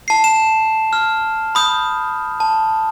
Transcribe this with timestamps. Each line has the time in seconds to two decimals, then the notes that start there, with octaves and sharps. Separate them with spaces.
0.08 A5 C7
0.24 E7
0.93 F6
1.55 B5 D#6 G6
2.40 A5